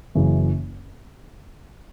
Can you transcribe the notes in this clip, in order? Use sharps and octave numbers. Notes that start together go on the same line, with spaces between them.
F#1 F#2 C#3 E3